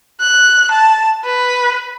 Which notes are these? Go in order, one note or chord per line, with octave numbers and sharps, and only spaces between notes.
F#6
A5
B4